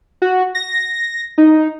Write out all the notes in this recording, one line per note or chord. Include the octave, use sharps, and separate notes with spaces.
F#4
A#6
D#4